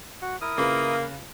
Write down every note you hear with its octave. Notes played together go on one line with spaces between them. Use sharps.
F#4 F#5
E4 A#4 D#6
C#3 A#3 F4 B4